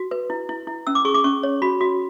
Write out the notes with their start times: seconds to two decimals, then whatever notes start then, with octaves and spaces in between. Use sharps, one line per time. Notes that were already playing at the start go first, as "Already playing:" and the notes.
Already playing: F#4
0.11 B4
0.30 E4
0.49 E4
0.67 E4
0.87 C#4 E6
0.95 D6
1.05 G#4 C#6
1.14 D6
1.24 C#4 C#6
1.43 C#5
1.62 F#4 B5
1.81 F#4